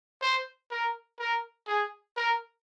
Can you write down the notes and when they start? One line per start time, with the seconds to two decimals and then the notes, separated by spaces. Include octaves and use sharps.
0.22 C5
0.71 A#4
1.19 A#4
1.68 G#4
2.17 A#4